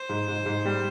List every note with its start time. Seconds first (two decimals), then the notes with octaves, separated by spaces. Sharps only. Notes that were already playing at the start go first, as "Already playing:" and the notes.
Already playing: C5
0.09 G#2
0.28 G#2
0.46 G#2
0.65 G3